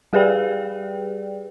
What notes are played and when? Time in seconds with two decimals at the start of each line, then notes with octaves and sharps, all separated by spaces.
0.13 G3 G4 G#4 B4 D5 G5